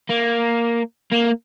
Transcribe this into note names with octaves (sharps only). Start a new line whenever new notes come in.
A#3
A#3